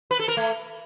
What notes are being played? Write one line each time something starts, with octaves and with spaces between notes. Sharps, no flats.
B4
A4
A#4
A3